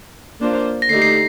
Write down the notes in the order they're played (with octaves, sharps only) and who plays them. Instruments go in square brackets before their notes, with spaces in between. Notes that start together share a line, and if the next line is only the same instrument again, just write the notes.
[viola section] A#3 D4 F4 C5
[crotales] A#6
[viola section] D3 A3 D#4 G4 [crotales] C7
[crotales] C7